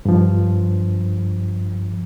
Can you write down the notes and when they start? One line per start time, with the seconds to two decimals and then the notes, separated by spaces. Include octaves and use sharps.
0.05 G2 F3